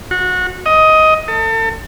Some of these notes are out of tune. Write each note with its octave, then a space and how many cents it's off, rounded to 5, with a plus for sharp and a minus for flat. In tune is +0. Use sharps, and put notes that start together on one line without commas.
F#4 -25
D#5 +15
A4 +35